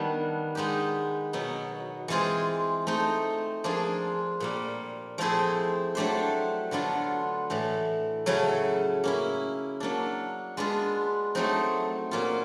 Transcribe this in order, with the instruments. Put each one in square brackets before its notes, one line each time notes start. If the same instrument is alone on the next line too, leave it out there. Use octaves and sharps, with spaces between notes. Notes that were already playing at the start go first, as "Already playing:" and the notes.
Already playing: [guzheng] D#3 G3 B3 D4
G#3 B3 D#4 G4
B2 F#3 B3 D#4
E3 G#3 C4 F4 G#4
A3 C4 D#4
F3 A#3 D4 F4 G#4
A#2 G3 A#3
F3 A3 C4 E4 G#4
F#3 A3 D4 G4 C5
D3 F#3 B3 D4 F4
A2 E3 A3
C#3 F#3 A3 C#4 E4
A#3 C#4 E4
F#3 A#3 D4
G#3 B3 D4 F4
F#3 A3 C4 D#4
A#2 F#3 A#3 C#4 F4